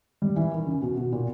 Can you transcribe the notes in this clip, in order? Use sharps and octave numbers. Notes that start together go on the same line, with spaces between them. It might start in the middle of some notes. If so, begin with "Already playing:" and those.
G3
E3
D#3
C#3
B2
B2
A#2